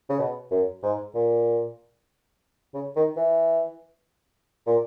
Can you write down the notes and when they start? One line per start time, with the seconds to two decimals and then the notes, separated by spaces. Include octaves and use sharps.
0.10 C#3
0.18 B2
0.51 F#2
0.83 G#2
1.15 A#2
2.74 C#3
2.96 D#3
3.17 E3
4.66 A#2